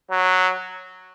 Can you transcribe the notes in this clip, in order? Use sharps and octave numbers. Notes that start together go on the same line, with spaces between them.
F#3